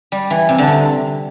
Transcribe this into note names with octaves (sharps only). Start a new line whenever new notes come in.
G3
E3
C3
D3
C3